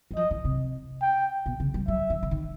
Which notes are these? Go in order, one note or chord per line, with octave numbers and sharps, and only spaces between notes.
F#3
F3 D#5
E3
C3
G5
B2
C#3
G3
F#3 E5
E3
D3
D#3